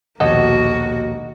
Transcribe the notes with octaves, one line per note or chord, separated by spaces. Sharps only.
A#1 D#2 B2 A#3 F#4 A4 D#5 F#5